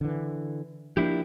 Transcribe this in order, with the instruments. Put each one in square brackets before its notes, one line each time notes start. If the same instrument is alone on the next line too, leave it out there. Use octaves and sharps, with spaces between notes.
[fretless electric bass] D3 E3
[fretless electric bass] F3 A#3 [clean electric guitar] D4 E4 G4